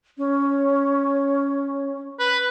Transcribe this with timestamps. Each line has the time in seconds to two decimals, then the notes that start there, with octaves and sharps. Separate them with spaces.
0.18 C#4
2.19 B4